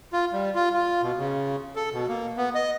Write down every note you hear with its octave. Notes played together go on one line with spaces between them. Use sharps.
F4
G3
F4
F4
B2
C#3
A4
B2
A#3
B3
D#5